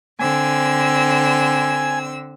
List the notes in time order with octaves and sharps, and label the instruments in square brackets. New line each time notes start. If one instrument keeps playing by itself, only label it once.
[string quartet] D3 C4 E6 [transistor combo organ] G#5